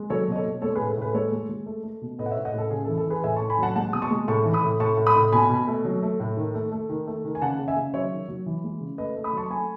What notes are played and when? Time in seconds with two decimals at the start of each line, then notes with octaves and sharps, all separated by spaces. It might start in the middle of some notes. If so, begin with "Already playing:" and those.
Already playing: G#3
0.10 F#3 A4 C#5
0.28 B2 D#5
0.36 A4 C#5
0.45 B2
0.62 G#3 A4 C#5
0.75 G#4 B4
0.79 A2
0.88 A4
0.97 A2 G#4 B4
1.14 G#3 A4 C#5
1.32 G#3
1.49 G#3
1.66 A3
1.83 A3
2.02 B2
2.19 A2 B4 D#5
2.26 F#5
2.31 C#5 E5
2.36 A2
2.45 D#5 F#5
2.54 A2 A4
2.71 C#3 G#4
2.85 A4
2.88 E3
2.98 A4
3.06 E3 G#4 B4
3.23 A2 E5 G#5
3.36 A5 C#6
3.41 A2
3.50 G#5 B5
3.59 F#3 F#5 A5
3.76 G#3 F#5 A5
3.93 B2 D#6
4.02 A5 C#6
4.11 G#3
4.28 A2 A5 C#6
4.45 E3
4.54 B5 D#6
4.63 A2
4.80 A2 A5 C#6
4.97 A2
5.07 B5 D#6
5.16 A2
5.32 B2 G#5 B5
5.50 B2
5.67 A3
5.85 F#3
6.03 A3
6.20 A2
6.37 D#3
6.54 A3
6.72 A3
6.89 D#3
7.07 A3
7.25 D#3
7.35 G#5
7.42 C#3 F#5 A5
7.59 C#3
7.68 E5 G#5
7.76 C#3
7.94 F#3 C#5 E5
8.12 D#3
8.28 F#3
8.46 E3
8.64 G#3
8.81 C#3
8.98 A3 B4 D#5
9.16 A3
9.24 B5 D#6
9.33 F#3 A5 C#6
9.50 A3 G#5 B5